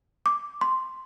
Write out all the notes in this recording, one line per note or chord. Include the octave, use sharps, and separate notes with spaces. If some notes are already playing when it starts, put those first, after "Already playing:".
D6
C6